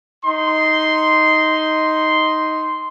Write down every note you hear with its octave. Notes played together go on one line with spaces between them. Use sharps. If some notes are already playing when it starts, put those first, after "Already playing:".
D#4 C6